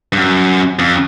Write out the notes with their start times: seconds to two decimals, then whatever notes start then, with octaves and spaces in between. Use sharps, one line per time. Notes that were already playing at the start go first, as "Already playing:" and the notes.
0.13 G2
0.18 F#2
0.79 F2